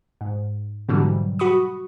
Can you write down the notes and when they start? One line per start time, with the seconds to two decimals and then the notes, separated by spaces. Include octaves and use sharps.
0.21 G#2
0.89 G#2 B2 D3 E3 F#3 G3
1.39 F#4 B5 C#6 D#6